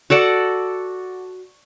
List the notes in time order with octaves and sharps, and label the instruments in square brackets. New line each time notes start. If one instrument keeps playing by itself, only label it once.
[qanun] F#4 A4 D5 F#5